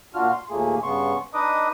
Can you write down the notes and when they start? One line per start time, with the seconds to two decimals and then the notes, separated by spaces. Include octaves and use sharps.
0.15 A#2 D4 F4 F#4 F6
0.32 C6
0.50 D#2 A#2 A3 A#3 G#4
0.83 G2 C#3 B3 C6 C#6
1.34 D4 D#4 B4 D#5 D6 D#6